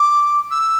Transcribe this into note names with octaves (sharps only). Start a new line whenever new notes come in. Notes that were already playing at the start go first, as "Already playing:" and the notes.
Already playing: D6
E6